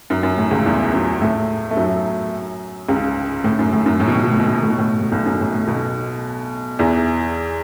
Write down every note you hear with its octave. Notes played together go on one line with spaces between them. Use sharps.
F#2
F#2
A2
C#2 C#3
E2 E3
F#2 F#3
A2 A3
A3
F#2 F#3
C#2 C#3
A2
F#2
A2
F#2
A2
B2
A2
B2
A2
B2
A2
B2
A2
B2
A2
A2
B1 B2
F#2
A2
A2
B1 B2
E2 E3